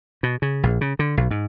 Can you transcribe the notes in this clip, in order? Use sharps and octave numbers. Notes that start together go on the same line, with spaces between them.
B2
C#3
A#1
C#3
D3
B1
G#2